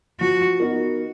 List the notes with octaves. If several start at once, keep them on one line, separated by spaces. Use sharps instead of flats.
F3 F#4
B3 D#4 F#4 A#4